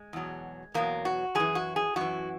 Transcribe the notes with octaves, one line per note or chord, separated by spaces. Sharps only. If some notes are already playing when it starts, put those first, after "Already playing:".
Already playing: G#3
E2 B2 F#3
E2 B2 F#3 A#3
F#4
F#2 E3 G#4
F#4
G#4
F#2 E3 F#4